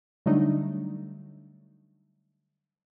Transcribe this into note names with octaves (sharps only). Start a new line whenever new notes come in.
D3 F#3 G3 A3 D4 D#4